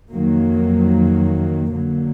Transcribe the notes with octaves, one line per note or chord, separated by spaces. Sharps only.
F2 D#3 F#3 A#3
D3 F#3 A#3